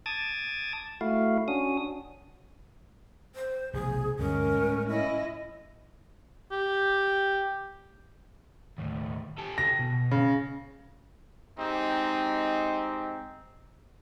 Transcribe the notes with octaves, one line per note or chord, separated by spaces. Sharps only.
A5 D6 D#6 G#6 A6
A3 E4 F#4 F5
C#4 D4 F#4 D#6
C5
F1 B1 F3 G#4
D2 G2 F#3 G#3 C#4 A#4
A2
C#4 E4 D#5
G4
D#2 A2
G4 A4
A#6
B2
C#3
G#3 C4 D#4 G4